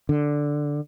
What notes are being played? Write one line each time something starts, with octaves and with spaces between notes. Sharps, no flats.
D3